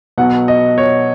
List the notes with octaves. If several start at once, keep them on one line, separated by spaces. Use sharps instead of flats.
B1 B2 F#3 F#5
D#5
C#5